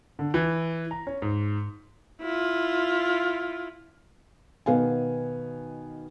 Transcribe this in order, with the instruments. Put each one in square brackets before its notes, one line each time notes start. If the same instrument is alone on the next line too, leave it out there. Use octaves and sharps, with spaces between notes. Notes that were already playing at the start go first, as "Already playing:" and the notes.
[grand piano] D3
E3
A#5
C#4
G#2
[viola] E4 F4
[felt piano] B2 D#3 B3 F5 G#5